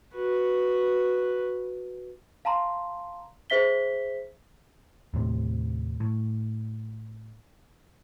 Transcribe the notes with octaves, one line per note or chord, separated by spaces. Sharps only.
F#4 B4
F5 A5 A#5 C6
G#4 C5 E5 B6 G7
D#2 A2 C3
A2